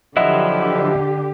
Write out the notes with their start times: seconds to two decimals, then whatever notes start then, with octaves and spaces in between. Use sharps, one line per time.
0.17 D3 F3 F#3 E4 G4 D#5 E5 F#5